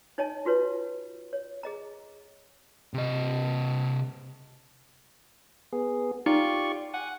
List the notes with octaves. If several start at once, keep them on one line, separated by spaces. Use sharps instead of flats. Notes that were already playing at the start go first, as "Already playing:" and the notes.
D#4 C#5 D#5 G#5 A5
F4 F#4 B4 C#5
C#5
G#4 D#5 A#5
C3 D#5
B3 G#4
D#4 F4 G4 D5 C#6
F#5 G#5